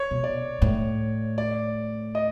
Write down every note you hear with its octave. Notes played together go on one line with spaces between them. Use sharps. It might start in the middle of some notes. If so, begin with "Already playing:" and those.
Already playing: C#5
B2
D5
A2
D5
D#5